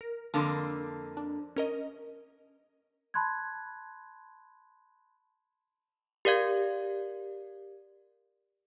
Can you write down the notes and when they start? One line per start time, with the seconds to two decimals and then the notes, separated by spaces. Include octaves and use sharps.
0.01 A#4
0.34 F2 D3 A#3 A5 C6
1.17 D4
1.56 C#4 A#4 D#5
3.14 A5 B5 C6 F#6 G#6
6.25 G4 A#4 D5 F5 G#6